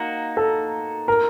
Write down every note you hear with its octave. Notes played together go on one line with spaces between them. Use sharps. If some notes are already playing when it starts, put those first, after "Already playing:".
Already playing: A#3 D#4 F#4
A4
A#4